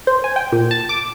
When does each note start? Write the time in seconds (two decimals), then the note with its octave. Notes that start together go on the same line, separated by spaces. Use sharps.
0.07 C5
0.24 G#5
0.36 G5
0.52 A#2
0.71 A5
0.89 D6